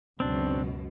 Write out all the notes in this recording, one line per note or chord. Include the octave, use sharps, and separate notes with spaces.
C#2 F#2 B2 C4 D4